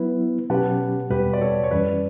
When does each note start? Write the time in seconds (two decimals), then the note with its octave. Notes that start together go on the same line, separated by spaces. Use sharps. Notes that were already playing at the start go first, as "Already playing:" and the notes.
Already playing: F#3 B3 E4 B4
0.50 B2 F#3 C#4 G4 B4 F#5 A5
1.10 E2 B2 G3 G4 B4
1.33 D5
1.41 A4 C#5
1.64 C#5
1.71 F#2 E3 G3 C#4 B4 D5